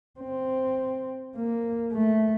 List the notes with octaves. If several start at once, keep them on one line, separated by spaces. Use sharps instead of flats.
C4
A#3
A3